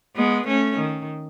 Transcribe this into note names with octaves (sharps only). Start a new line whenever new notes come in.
G#3 B3
A3 C#4
D#3